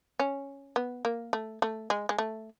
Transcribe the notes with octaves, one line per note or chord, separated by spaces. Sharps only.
C#4
B3
A#3
A3
A3
G#3
G#3
A3